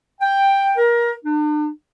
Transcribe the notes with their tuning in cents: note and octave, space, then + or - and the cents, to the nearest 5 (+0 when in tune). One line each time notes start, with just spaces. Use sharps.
G5 +5
A#4 +25
D4 +40